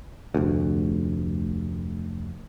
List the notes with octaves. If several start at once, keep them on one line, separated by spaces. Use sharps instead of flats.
F1 D2